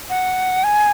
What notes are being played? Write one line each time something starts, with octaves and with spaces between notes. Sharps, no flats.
F#5
G#5